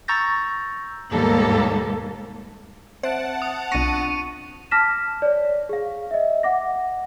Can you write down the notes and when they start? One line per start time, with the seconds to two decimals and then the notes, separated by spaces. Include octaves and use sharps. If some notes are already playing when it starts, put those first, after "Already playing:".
0.08 A#5 C#6 E6 G6 A6 A#6
1.11 D#2 G#2 B2 G3 A#3 A4
3.03 C4 C5 E5 F#5 A5 D7
3.42 D#6
3.72 B1 C4 D4 F4 C#6 A#6 C#7 D#7
4.71 A5 D6 F6 A#6 B6 E7
5.22 C#5 D5
5.69 G#4 F5
6.11 D#5 E5
6.43 F#5 D6 A#6